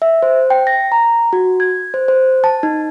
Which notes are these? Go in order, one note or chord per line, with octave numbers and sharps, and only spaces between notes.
E5
C5
G5
A#6
A#5
F#4
G#6
C5
C5
A5
D#4